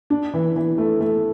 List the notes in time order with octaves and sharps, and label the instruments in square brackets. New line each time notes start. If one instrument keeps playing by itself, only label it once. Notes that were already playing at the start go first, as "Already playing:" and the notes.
[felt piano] D4
E3
E3
A3
A3